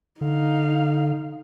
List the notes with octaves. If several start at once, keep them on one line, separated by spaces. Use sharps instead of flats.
D3 D#4 F5